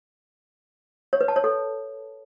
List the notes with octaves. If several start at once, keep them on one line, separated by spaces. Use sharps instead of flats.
C#5
B4
A5
C#5
A4